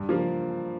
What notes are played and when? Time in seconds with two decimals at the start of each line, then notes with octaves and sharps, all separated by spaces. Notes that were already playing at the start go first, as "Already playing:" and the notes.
Already playing: G2
0.09 F3 A#3